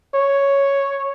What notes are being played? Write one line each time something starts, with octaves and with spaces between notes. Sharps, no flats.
C#5